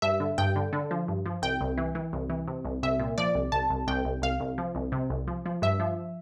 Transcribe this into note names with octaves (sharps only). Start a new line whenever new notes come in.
G2 E5
D3
G2 G5
D3
D3
F3
G2
F3
C2 G5
C2
E3
E3
C2
E3
C3
C2
C2 E5
A#2
F3 D5
C2
C2 A5
C2
C2 G5
C2
C2 F5
C2
F3
C2
C3
C2
F3
F3
G2 E5
F3